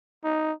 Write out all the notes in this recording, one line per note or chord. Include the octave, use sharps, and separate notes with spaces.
D#4